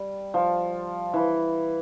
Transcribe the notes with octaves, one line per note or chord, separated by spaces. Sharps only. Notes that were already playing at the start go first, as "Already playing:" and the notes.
Already playing: G3
F3
E3